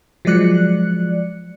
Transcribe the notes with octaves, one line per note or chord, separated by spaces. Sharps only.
F3 F#3 G#3 D5 F#6 C#7